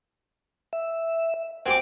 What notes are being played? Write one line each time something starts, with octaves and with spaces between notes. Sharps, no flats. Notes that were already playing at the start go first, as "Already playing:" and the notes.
E5
C4 G4 F#5 G#5 D6